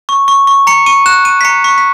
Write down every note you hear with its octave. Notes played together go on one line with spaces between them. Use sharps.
C#6
C#6
C#6
A#5 C#7
C#6 D#7
F#6 E7
F#6 D#7
B6
A#5 C#7
C#6 B6
B6